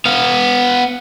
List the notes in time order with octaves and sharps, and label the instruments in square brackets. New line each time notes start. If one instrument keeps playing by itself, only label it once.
[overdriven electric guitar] B3 F5